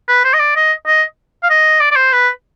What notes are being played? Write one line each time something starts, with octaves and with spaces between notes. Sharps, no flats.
B4
C5
D#5
D5
D#5
D#5
F5
D#5
D5
D5
C5
B4